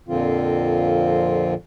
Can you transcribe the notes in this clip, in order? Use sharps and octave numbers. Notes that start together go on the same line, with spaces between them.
F2 A#2 D3 F3 C4 F4